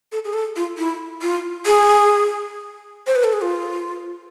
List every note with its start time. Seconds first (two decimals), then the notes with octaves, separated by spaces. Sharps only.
0.12 A4
0.25 G#4
0.33 A4
0.56 F4
0.78 E4
1.22 F4
1.66 G#4
3.07 C5
3.16 B4
3.24 A4
3.33 G#4
3.42 F4